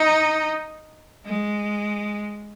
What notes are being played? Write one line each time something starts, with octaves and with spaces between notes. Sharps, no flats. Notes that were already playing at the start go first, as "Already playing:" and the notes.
Already playing: D#4
G#3